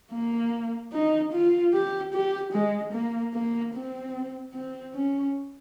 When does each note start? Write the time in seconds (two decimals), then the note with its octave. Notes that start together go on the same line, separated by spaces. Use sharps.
0.13 A#3
0.93 D#4
1.33 F4
1.73 G4
2.13 G4
2.53 G#3
2.93 A#3
3.34 A#3
3.74 C4
4.53 C4
4.94 C#4